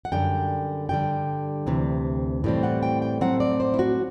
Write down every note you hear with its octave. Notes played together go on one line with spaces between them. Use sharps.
F#5
F#2 D3 G3 G5
G2 D3 G3 G5
D2 C3 E3
A2 E3 G3 C4
F#5
G5
G5
A2 F#3 C4 F#5
D5
C5
E4
F#4